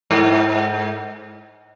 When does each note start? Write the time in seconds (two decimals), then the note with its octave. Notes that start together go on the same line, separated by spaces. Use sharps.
0.11 G#2